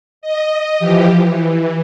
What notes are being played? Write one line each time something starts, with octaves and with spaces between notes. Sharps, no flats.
D#5
E3 F3 G4
E3